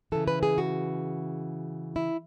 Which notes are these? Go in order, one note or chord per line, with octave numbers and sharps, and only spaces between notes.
C#3 E3 A4
B4
G#4
F#4
E4